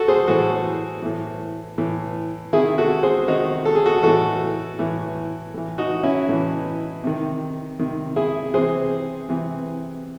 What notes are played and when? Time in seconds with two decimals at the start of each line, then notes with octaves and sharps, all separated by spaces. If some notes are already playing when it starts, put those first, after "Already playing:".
Already playing: F#4 A4
0.08 G#4 C5
0.28 A2 E3 F#4 A4
1.02 A2 E3
1.78 A2 E3
2.53 D#3 E4 G#4
2.57 C3
2.78 F#4 A4
3.03 G#4 C5
3.28 C3 D#3 D#4 F#4
3.65 A4
3.75 G#4
3.86 F#4 A4
4.03 A2 E3 F#4 A4
4.79 A2 E3
5.54 A2 E3
5.78 D#4 F#4
6.03 C#4 E4
6.29 A2 E3
7.04 C3 D#3
7.79 C3 D#3
8.16 E4 G#4
8.54 C3 E3 G#4 C5
9.29 C3 E3